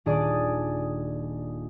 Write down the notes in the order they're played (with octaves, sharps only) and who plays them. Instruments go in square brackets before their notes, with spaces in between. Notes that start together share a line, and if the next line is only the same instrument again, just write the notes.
[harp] D#1 D4 G#4 D5 D#6